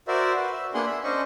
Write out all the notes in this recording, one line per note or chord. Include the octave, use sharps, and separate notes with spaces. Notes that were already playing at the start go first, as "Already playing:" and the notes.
F#4 A#4 C5 D5 E5
F#4 B4
E5
A#3 B3 D4 G#4 F#5 C6
E5 B5
C#4 D4 C5 D#5 C#6